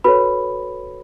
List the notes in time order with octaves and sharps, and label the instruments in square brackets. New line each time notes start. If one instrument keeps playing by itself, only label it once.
[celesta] F#4 A4 B4 C#5 B5